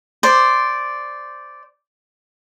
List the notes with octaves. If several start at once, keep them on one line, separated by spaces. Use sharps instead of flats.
C5 D5